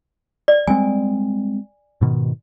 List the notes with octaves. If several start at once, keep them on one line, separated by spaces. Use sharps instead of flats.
D5
G3 G#3 C4 G#5
G#2 B2 D#3